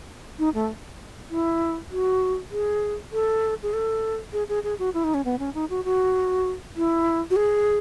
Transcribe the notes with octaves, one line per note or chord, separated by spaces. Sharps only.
D#4
A3
E4
F#4
G#4
A4
G#4
A4
G#4
G#4
G#4
F#4
E4
D#4
C#4
B3
C#4
D#4
F#4
F#4
E4
F#4
G#4